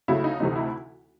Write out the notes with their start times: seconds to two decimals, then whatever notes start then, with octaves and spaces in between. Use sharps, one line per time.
0.08 D2 C#3 F#3 A3 E4
0.24 D#4
0.40 D2 C3 E3 A3 D#4
0.56 E4